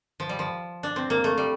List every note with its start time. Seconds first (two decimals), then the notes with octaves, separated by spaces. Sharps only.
0.20 F3
0.29 G3
0.39 F3
0.83 D4
0.96 C4
1.10 A#3
1.24 A3
1.37 G3